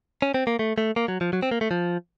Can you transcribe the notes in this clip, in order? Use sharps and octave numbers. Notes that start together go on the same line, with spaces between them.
C#4
C4
A#3
A3
A3
A#3
F#3
F3
F#3
C4
A#3
A3
F3